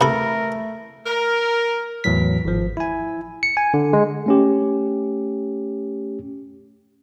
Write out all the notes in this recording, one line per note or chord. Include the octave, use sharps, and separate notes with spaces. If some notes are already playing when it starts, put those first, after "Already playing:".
C3 E3 A3 A4 A#4 B5
A#4
E2 A2 E3 F#3 B6
G#1 F3
E4 G#5
C#7
G#5
D3
G#3
A3 C#4 G4